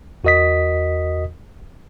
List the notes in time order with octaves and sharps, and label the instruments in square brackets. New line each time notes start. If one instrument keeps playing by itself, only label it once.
[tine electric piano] E2 F#4 A#4 D#5 D#6 B6